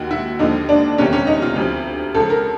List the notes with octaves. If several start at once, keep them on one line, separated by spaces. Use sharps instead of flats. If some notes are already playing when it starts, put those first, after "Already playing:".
Already playing: D#2 D#3 F#4
E4
D#2 D3 F3 D#4
D4
F#1 E2 C3 D#3 C#4
C#4
D#4
F4
D2 C3 F3
C#2 C#3 F3 A4
A#4